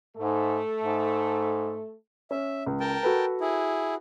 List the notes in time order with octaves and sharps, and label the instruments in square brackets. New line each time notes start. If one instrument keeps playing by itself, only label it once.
[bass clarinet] G#2 [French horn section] A3 A4
[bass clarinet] G#2
[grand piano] C#4 [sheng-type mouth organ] E5
[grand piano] C#2
[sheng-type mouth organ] A#4 G5 A5
[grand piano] F#4 A4 B4
[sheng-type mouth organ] E4 G#4